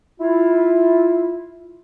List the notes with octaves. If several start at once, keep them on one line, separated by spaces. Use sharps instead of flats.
E4 F4